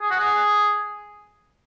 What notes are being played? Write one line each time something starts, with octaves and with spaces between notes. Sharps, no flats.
G#4
F#4
G#4